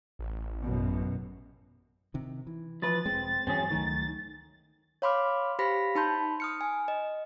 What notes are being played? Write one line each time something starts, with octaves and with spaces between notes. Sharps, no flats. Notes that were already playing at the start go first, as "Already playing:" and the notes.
A1
F#2 B2
C3 D#3
E3
F3 B4 A6
E1 G#3 C4
G2 E3 F#3 C4 C#4 G#4
C#2 D#3 F#3 A3
C#5 F5 B5 C6 D6 F6
G4 C5 F5 B5 A#6 B6
D#4 A5 B5 C6 G6
D#6 F6 C#7
G#5
D#5